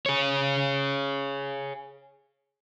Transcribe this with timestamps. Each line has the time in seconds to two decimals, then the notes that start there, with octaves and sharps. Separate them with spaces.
0.06 G#4 C#5